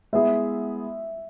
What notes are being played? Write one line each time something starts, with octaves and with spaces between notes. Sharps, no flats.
G#3 B3 E4 G#4 E5